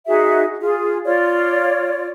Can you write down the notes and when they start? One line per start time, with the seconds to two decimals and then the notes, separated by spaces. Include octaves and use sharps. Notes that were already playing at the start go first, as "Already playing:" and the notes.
0.07 D#4 F#4 G#4 E5
0.61 F4 G#4
1.04 F4 C#5 D5